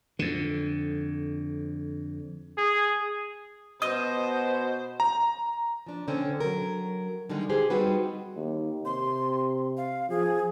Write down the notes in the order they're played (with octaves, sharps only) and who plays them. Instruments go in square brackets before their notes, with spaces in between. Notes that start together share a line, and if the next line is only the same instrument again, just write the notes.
[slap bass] F2 D3
[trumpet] G#4
[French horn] B2 [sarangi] C5 [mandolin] D#5 [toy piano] D#6
[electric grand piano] A#5
[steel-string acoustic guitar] F3 D4
D3 C4 C#4
F#3 A#4
D3 D#3 G3 G#3 D4 D#4
G4 G#4 C5
G3 C4 D#4 F#4 B4
[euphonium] D#2
[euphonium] C3 [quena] C6
[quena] F5
[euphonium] F3 [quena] G#4